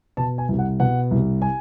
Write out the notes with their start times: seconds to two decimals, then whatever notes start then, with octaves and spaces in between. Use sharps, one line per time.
0.17 B2 A5
0.38 G#5
0.49 C2
0.59 F#5
0.80 B2 F#5
1.11 C2
1.42 G#5